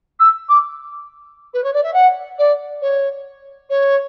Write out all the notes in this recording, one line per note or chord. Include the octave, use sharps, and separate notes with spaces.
E6
D6
B4
C#5
D5
E5
F#5
D5
C#5
C#5